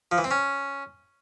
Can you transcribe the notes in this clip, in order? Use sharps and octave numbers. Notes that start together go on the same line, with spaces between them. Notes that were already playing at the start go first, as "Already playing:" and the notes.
F3
E3
C4
C#4